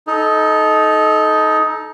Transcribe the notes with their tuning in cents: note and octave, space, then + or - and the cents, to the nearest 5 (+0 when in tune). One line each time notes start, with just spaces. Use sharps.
D#4 +10 A4 -20